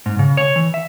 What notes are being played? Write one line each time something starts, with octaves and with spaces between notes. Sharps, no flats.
G#2
C#3
C#5
E3
E5